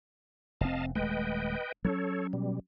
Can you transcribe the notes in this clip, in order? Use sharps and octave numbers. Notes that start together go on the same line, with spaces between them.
F1 C4 D#5 F5 A5
D#1 G#3 A3 B4 D#5 G5
F#3 C4 C#4 A4 C#5
B2 G3